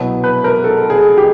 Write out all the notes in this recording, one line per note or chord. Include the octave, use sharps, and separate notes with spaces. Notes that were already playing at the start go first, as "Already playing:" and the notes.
Already playing: C2 B2 F#3 B3
B4
A#4
A4
G#4
G4